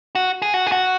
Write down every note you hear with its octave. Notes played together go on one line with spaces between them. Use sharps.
F#4
G#4
F#4
G#4
F#4